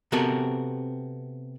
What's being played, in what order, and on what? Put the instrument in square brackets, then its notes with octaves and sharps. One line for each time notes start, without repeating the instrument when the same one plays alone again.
[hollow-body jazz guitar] C3 B3 C4 F#4 A4 A#4